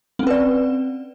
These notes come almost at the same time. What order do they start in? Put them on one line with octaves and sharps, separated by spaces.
C4 C#4 B4 D5